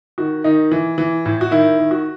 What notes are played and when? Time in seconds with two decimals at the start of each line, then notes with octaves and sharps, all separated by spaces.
0.18 D#3 F#4
0.44 D#3 D#4
0.71 E3
0.98 E3
1.26 A2
1.41 F#4
1.51 D#3 E4
1.78 D#3
1.91 F#4